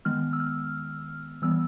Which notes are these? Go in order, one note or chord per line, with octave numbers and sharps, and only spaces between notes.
D#3 G#3 B3 F6
E6
F6
E3 G3 B3 E6